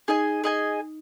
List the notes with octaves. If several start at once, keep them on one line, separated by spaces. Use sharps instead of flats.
D#4 G#4 D#5 G#5
G#4 D#5 G#5